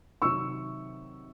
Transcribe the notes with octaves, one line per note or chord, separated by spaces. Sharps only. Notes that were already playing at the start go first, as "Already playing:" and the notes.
C3 D#3 F#3 C#6 E6